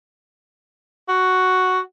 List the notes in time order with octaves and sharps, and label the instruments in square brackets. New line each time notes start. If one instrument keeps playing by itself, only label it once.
[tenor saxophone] F#4